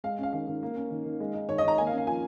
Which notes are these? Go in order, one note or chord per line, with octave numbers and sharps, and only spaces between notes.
G#3 F5
C#4 F5
D#3 F5
D#3
A#3
C#4
D#3
D#3
G#3
D#4
D#3 C#5
D#5
D#3 A#5
A#3 G#5
F5
C#4
F5
F3 G#5